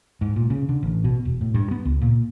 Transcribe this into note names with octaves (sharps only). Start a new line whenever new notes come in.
G#2
A#2
C#3
D3
A1
B2
E1
A2
G2
B3
C#2
A#2